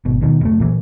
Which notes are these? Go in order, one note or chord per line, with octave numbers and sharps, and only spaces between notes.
G#1 B2
D#2 B2 D#3
F#1 A3
A#2 E3 A#3